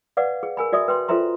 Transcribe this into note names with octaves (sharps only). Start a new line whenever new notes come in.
B4 D5 F5 F#5 D6
G#4
A#4 G#5 B5
F#4 D5 E5 D#6
B4 G5 C6
F4 A4 C5 E5 A#5 C6